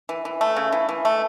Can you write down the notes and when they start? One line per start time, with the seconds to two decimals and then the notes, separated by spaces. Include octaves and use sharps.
0.09 E3
0.25 E3
0.41 A3
0.56 C#3
0.72 E3
0.89 E3
1.05 A3